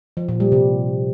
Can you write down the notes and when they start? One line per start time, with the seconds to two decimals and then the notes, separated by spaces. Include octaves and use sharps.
0.17 F3
0.29 A#2
0.40 G3
0.52 C3